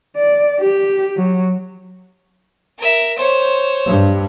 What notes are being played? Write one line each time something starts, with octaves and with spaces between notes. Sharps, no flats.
D5
G4
F#3
A#4 E5
C5 C#5
G2